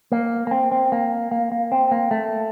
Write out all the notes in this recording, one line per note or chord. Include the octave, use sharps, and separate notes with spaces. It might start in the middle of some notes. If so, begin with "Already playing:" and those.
A#3
A#3
C4
C4
A#3
A#3
A#3
C4
A#3
A3